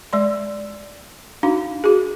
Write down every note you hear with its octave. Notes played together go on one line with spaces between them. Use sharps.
G#3 D5 C6
D4 D#4 F#4 F5
F#4 G#4